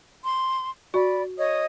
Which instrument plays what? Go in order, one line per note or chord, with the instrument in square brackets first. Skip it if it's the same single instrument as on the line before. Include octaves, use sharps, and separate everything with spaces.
[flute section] C6
[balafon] F#4 [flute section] D5 B5
[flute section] C#5 D#5 D#6